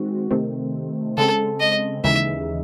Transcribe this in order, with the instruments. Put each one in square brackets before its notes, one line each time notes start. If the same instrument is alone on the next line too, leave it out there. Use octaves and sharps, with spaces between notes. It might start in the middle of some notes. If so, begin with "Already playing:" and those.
Already playing: [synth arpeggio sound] D#3 G#3 C4 F#4
C3 D#3 A3 C4
[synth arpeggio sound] C#3 G#3 C4 [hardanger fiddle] A4
[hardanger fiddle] D#5
[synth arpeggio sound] D#2 C#3 E3 G#3 D#4 [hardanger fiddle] E5